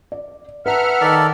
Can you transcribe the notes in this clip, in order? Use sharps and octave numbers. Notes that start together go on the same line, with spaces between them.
D5
B4 E5 F#5 A5 A#5 F6
D#3 A4 A#4 D5